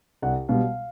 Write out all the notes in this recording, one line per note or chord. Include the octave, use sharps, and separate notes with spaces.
C2 F#5
B2 G3 F5